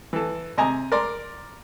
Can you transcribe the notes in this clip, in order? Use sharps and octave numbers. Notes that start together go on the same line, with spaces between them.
E3 A4
C3 D#5 G#5 A#5
A#4 D5 C6